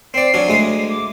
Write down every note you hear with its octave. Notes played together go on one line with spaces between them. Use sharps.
C4 D5 C7
F#3 C#4 D4
D2 G#3 D#6
D6